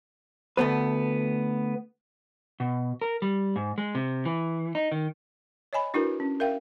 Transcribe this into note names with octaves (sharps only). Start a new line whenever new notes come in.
D2 A3 B3 B4
B2
A#4
G3
G#2
G#3
C3
E3
D#4
D#3
C#5 D#5 G#5 B5
D4 E4 F#4 A#4 B4
C#4
A#4 E5 F5 G5